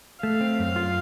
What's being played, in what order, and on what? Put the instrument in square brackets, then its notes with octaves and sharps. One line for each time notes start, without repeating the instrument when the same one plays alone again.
[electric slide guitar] A3 [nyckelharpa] F5
[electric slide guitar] C4
F#2
F4